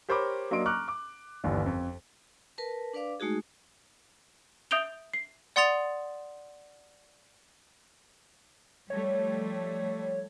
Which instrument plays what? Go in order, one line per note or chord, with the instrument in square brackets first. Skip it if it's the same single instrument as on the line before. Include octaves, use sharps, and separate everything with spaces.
[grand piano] G4 A#4 C5 C#5 B5 D6
F#3 A#3 D4 D#5 C6 D7
A#5 C#6 D6 F6 F#6
D6
G1 D#2 E3 D4
F2
[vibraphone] A#4 B4 A5
D4 B4 D5 F5 D6
G#3 A3 D#4 F#4 G#4
[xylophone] E5 D#6 G6 D7 F7 G7
C7
D5 F#5 C6 D#6 A6 F7
[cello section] F3 G3 A3 [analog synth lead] C#5